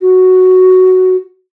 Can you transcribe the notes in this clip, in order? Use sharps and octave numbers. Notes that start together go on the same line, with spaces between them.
F#4